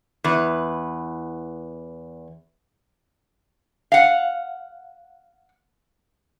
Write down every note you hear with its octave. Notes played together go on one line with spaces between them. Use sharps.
E2 B4
F5 F#5